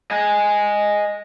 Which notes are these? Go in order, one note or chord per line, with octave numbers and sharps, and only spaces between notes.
D#5 G#5